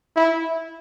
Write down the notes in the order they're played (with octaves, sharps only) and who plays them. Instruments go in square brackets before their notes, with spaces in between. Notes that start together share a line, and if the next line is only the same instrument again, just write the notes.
[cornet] E4